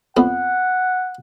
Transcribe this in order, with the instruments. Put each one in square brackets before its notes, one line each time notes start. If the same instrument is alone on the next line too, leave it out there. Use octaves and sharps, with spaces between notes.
[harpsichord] F2 B3 [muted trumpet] F#5